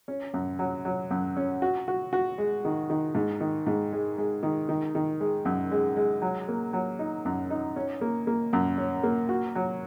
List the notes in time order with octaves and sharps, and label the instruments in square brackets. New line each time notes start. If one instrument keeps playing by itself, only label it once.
[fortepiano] C#4
F#2
F#3
F#3
F#2
C#4
F#4
F#4
F#4
G#3
D#3
D#3
G#2
D#3
G#2
G#3
G#3
D#3
D#3
D#3
G#3
F#2
G#3
G#3
F#3
A#3
F#3
D#4
F#2
D#4
C#4
A#3
A#3
F#2
C#4
A#3
F#4
F#3